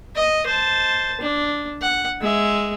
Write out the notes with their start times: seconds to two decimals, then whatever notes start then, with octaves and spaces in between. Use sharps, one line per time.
0.15 D#5
0.46 C5 A5
1.21 D4
1.82 F#5
2.21 G#3 E5